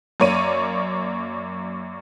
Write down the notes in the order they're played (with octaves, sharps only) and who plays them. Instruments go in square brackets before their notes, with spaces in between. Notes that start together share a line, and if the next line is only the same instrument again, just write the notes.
[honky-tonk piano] F#2 A#3 C#5 D5 D#7